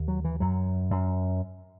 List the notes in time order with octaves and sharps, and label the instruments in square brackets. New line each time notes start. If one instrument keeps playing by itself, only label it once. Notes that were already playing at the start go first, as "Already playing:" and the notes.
Already playing: [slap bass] D#2
F#3
E3
F#2 F#3
F#2